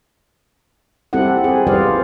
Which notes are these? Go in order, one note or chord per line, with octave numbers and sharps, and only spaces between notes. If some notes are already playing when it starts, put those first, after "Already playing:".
G3 C4 E4 G4 A4 F#5
E4 G#4
G3 F4 B4 C5 D5 F5